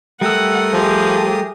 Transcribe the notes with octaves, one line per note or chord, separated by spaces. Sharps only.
G3 A3 A#4 F#5 D#6 E6
F3 G4 G#4